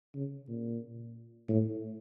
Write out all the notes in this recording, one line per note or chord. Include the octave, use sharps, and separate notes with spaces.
C#3
A#2
A2